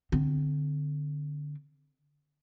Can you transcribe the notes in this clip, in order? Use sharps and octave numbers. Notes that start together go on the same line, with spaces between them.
D3 C4